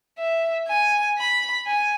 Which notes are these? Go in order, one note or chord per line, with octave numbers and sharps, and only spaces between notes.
E5
G#5
B5
G#5